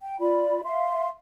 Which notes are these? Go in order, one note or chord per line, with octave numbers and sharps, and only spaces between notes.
G5
F4 D5 B5
E5 F5 C6